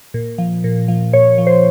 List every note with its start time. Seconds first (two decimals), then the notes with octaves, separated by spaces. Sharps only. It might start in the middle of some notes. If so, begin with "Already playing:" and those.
0.14 A#2
0.38 F3
0.64 A#2
0.88 F3
1.13 A#2 C#5
1.38 F3
1.47 C5